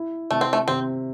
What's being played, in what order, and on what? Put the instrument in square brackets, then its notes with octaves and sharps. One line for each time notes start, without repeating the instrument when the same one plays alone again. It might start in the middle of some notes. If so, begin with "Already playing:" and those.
Already playing: [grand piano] E4
[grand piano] C3 [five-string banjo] A3
[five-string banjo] C4
A3
[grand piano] C3 [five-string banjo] C4